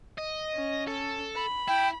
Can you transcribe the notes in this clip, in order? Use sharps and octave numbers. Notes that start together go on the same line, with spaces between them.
D#5
C#4
A4
B5
E4 G5